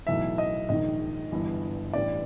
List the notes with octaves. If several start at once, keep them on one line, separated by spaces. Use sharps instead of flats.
B1 A2 E3 E5
D#5
A#1 G#2 D#3 D#5
G1 G2 E3
A1 G2 E3 D5